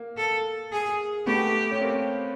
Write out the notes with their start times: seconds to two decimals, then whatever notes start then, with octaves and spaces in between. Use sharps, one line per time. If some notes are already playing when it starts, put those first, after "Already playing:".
Already playing: A#3
0.17 A4
0.72 G#4
1.27 A3 B3 G4
1.71 C#4
1.81 A#3 C4